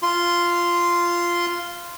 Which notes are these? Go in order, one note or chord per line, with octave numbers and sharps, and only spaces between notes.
F4 C6